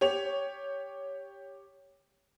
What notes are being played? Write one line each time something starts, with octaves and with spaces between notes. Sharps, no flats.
G4 C#5 F7